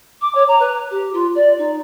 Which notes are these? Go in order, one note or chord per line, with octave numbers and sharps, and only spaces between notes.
D6
C#5
A#5
B4
G4
F4
D5
D#4